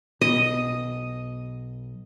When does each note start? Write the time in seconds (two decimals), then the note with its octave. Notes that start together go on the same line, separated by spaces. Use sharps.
0.21 B1 B2 D#5